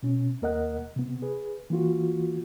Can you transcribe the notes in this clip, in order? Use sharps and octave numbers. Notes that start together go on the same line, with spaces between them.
B2 C#4
D#2 A#3 A#4 D#5 F#5 F#6
C3 B3
G#4 B4
E3 A#3 F4 F#4